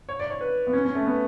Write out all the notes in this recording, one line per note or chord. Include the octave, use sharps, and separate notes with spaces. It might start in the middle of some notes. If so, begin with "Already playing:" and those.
C#5
D5
C#5
B4
B3
C#4
C#4
A3
B3